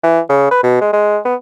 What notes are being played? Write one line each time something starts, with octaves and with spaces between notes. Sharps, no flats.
E3
C#3
B4
B2
G#3
G#3
B3